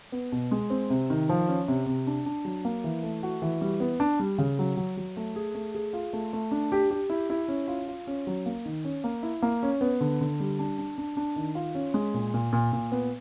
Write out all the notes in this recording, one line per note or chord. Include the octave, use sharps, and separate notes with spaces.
B3
B2
G#3
C4
C3
D#3
F3
C#4
C3
C3
D4
D4
F#3
A#3
E3
A3
F#4
E3
G3
B3
D4
G3
C#3
F#3
F#3
F#3
A3
G#4
A3
G#4
F4
A3
A3
D4
G4
G4
E4
E4
C#4
F4
F4
C#4
F#3
A#3
D#3
C#4
A#3
E4
A#3
C#4
B3
D3
D3
G3
D4
D4
D4
D4
D#3
F4
C#4
G#3
A#2
A#2
A#2
A#2
B3